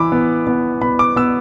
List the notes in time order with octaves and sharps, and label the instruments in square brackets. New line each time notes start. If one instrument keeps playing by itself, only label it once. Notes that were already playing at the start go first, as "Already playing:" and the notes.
Already playing: [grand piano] E3 B5 D6 E6
B3
B3
B3 B5
D6
B3 E6